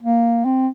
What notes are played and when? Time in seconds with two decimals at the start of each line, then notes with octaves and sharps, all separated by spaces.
0.02 A#3
0.45 C4